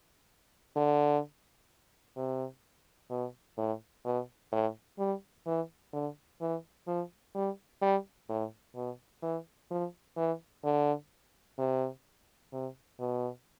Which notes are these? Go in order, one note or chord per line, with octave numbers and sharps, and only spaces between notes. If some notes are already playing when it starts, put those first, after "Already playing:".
D3
C3
B2
A2
B2
A2
G3
E3
D3
E3
F3
G3
G3
A2
B2
E3
F3
E3
D3
C3
C3
B2